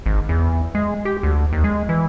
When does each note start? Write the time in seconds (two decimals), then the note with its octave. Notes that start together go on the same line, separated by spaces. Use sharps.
0.06 G#1
0.29 E2
0.75 G#3
1.05 G4
1.23 D2
1.53 D#2
1.64 G#3
1.89 E3